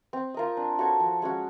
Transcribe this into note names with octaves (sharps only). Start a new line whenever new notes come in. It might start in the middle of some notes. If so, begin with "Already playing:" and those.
C4
F4 A#4 D#5
D4
F#4 A4 C#5
F3
G#3 C#4 F#4